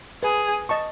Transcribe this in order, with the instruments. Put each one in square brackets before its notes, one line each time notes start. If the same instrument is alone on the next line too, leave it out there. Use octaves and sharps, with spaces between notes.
[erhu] G#4 [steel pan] B4
[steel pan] D#5 A5 C#6